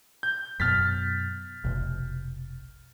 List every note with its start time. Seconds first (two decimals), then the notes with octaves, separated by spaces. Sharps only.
0.23 G6
0.60 F#2 B2 F6 A6 B6
1.64 F1 B1